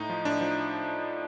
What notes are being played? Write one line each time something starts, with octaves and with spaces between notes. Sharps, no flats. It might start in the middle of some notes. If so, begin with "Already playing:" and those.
Already playing: A2 D#4
F3
A2 D4
F3